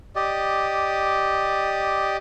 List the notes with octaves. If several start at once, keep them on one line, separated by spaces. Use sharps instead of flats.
G4 D5 D#5